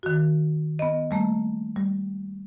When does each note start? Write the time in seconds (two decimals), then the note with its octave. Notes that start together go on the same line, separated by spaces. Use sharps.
0.03 D#3 F#4
0.79 B3 D#5
1.11 G3 A3 A#3
1.76 G3